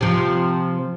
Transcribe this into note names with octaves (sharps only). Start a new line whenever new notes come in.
C3 F3